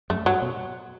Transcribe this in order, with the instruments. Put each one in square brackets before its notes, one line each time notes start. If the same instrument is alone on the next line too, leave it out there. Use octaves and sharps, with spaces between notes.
[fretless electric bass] F#2 [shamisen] A3
[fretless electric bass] G2 [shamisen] F#3
[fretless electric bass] B2